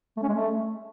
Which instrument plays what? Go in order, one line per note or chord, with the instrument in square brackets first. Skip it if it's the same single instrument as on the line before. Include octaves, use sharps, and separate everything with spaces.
[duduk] A3
C#4
G#3
A3